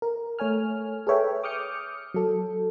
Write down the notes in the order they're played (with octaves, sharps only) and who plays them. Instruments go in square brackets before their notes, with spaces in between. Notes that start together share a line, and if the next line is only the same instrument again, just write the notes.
[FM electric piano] A#4
A3 C#5 G#5 F6
G#4 A4 B4 C#5 E5 G5
D6 D#6 F6 G6 C#7
F#3 A4